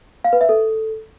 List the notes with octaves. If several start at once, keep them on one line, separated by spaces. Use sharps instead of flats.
F5
B4
E5
A4